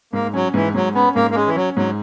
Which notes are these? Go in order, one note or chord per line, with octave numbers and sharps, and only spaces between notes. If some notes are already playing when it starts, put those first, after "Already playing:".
G#2 A#3
F#3 C#4
G#2 E3
G#2 F#3
B3 C#4
G#2 A#3
A#3
G#3 C#4
E3
F#3 C#4
G#2 F#3